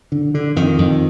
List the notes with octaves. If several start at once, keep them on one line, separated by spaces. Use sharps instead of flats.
D3
D3
F2 D#3
F2